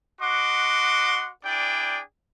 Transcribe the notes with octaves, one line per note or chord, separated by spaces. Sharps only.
F#4 D#5 F#5 C6 D6
D4 E4 G#4 D5 G5